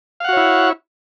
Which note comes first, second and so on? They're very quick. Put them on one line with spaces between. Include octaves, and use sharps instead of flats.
F5 F#5 F#4 C#5 E4